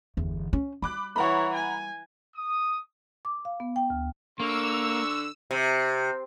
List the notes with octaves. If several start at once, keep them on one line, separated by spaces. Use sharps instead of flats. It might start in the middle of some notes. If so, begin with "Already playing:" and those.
G1 E2
C#4
G3 B5 D6 F#6
E3 C#5 F#5 A#5 B5
G#5
D#6
D6
F5
B3
G5
D2
D3 A#3 C#6 E6
C3